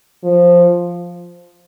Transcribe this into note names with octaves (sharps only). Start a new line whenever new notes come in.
F3